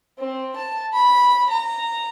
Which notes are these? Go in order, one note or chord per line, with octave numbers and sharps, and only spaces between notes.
C4
A5
B5
A#5